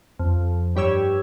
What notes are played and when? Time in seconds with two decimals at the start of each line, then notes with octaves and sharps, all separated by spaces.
0.19 F2
0.76 G2 G4 C#5 E6 G#6